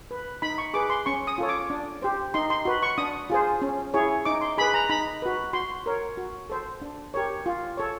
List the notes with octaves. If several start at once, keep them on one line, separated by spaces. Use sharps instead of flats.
B4
D#4 B5
C#6
G#4 B4 D6
C6
C#4 C#6
D#6
F4 A4 C#5
D6
D4
G4 C5
D#4 C6
C6
F#4 B4
C#6
D4 D#6
F4 G#4 C5
C#4
E4 G#4 C#5
D#4 D6
C6
G#4 B4 B5
A#5
D#4 B5
F#4 B4
F#4 C6
A#4 C#5
F#4
A4 C5
D4
G4 A#4 C#5
F4
A4 C#5